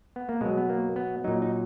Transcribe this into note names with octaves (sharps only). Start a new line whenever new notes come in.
B3
A#3
B2 F#3 G#3
B3
A#3
B3
A#2 F#3 D#4
D#4